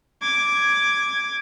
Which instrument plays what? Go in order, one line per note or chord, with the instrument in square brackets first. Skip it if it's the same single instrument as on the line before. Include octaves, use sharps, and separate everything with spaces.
[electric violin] D6 G#6